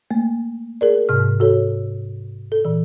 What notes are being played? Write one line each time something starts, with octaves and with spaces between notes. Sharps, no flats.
A3 A#3
G#4 A#4 D5
G#2 C3 F6
F#4 A4 C#5
A4
A#2 E3